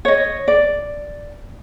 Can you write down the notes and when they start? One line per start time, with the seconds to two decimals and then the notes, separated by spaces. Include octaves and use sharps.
0.05 C#5 D#5
0.48 D5